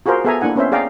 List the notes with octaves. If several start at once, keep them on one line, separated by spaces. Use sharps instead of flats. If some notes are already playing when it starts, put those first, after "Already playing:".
F4 F#4 G#4 A#4 C5
B3 G#4 A4 E5 G#5 A#5
A#3 D4 E4 F#5 G#5
B3 C#4 C5 E5
G#4 D5 F5 G5 A#5